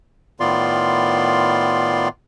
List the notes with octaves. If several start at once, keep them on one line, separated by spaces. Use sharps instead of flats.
A2 D#3 B3 F4 D5 C6